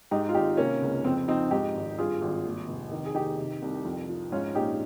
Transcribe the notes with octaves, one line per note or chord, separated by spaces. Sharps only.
G#2 D#4 G4
F4
G#1 D#4 G4
C3 A#3 C#4
C#2
F2 C4
F3 C4 D#4
G#2 D#4 G4
G#1
G2 F4 G#4
G#1
D#2
F1
D#3
G#4
D#3 D#4 G4
C3
C2
F2
F3
G#2 C#4 F4
A#1 D#4 G4